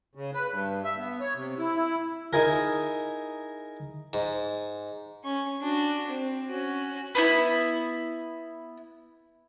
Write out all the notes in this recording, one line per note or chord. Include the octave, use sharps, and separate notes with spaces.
C#3
B4
G2
E5
B3
C#5
C3
E4
E4
D#4 E4 G#4 A#4
G#2
C#4 C#6
D4 F#4
C4
C#4 F#4
B3 D4 E4